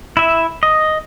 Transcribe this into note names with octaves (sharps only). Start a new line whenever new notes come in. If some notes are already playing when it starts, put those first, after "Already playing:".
E4 E5
D#5